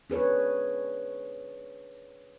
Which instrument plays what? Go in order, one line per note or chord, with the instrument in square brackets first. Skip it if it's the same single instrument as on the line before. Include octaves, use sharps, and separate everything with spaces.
[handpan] D4 G#4 B4 C#5